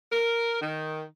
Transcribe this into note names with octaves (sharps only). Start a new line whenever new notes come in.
A#4
D#3